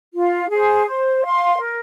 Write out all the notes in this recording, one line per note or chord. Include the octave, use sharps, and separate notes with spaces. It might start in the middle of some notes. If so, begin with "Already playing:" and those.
F4
G#4 C5
C5
F5 C6
A#4